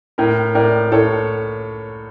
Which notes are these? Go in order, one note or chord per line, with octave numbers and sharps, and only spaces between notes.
A2 A#4
A2 A#4 D5
A2 A4 C#5